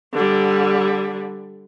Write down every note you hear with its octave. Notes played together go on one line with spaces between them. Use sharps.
D3 G3